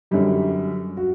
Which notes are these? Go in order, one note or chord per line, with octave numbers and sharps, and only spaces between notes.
F#2 D3 G3 D#4
F#4